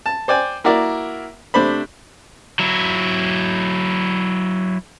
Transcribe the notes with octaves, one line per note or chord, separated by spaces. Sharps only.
A5
C5 D5 G5 G#5
A#3 E4 F#4 A#4 D5
C3 A3 D4 C5 B5
F#3 E4